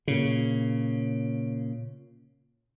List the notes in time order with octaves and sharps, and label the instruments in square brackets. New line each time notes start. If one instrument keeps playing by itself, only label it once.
[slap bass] A#2 C#3